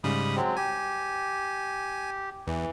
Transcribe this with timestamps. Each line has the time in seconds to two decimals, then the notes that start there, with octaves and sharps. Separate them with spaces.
0.04 G#2 C#3 G3 B5 D#6
0.36 F#3 G#3 C4
0.57 G4 G#5
2.47 E2 E3